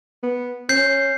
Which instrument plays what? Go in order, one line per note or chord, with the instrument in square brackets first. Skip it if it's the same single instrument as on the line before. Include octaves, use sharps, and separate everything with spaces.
[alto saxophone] B3
[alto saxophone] C#4 [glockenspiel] G6 C7